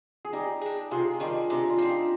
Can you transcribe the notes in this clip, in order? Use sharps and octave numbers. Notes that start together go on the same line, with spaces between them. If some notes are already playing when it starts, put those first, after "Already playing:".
G#4
G3 D#4 G4
D4 G#4
C3 F4 G#4
D#3 G3 D4
C3 D#4
D4 F4
F3 C4
D#4 G4